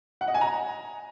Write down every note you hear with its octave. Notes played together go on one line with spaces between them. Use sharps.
F#5
D#5
G#5
A#5